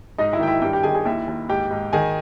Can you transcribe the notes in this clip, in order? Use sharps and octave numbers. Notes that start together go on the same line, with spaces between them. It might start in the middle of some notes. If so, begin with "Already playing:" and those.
G#2 D#4 D#5
E4 E5
D#3 G5
E4 E5
G2 G4 G5
G4 G5
D#3 G#4 G#5
G#4 G#5
D#2 E4 E5
D#2
G#2 G4 G5
G#2
D#3 G#4 G#5